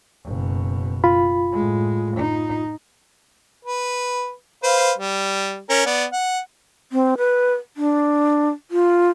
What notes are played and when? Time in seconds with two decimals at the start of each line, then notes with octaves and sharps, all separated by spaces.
0.24 F#1 B2
1.04 F4 B5
1.53 A2 G#3
2.17 D#4
3.65 B4
4.63 B4 C5 F5
4.98 G3
5.70 C#4 A#4
5.86 B3 D5
6.13 F#5
6.92 C4
7.18 B4
7.77 D4
8.71 F4